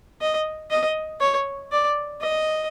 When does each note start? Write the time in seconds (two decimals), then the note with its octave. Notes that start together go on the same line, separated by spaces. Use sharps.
0.21 D#5
0.71 D#5
1.21 C#5
1.72 D5
2.21 D#5